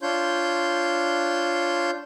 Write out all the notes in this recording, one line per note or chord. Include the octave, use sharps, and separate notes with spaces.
D4 F4 C#5 C6 G6